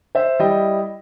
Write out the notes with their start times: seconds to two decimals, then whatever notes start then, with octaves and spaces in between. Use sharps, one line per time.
0.15 C5 E5
0.39 G3 E4 D#5 G5